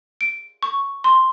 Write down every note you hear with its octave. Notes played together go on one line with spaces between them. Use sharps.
D7
C#6
C6